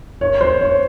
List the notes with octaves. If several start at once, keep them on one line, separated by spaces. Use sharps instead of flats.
C#5
C5
C#5